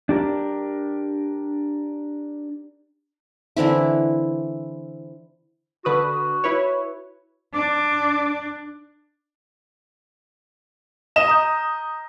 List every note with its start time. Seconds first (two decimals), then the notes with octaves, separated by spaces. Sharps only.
0.09 D4 G4 A#4
3.57 D3 E3 C4 E4
5.85 D3 F#4 B4 D#6
6.44 E4 B4 C#5
7.54 D4 D6
11.16 D#5 E7
11.28 A#5 D#6 G6